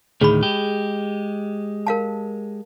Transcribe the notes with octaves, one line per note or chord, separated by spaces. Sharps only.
D2 A2 D#3 G#4 B5
G#3 G4
A#4 F5 A5